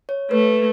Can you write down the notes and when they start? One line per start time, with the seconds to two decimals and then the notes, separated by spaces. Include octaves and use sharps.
0.09 C#5
0.31 A3 B4